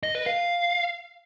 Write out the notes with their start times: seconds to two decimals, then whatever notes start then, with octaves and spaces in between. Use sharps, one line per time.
0.03 D#5
0.15 B4
0.26 F5